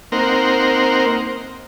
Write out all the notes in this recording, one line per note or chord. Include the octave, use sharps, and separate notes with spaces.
A#3 C4 D#4 A#4 C5 F#5